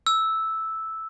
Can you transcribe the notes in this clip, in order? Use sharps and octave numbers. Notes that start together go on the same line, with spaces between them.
E6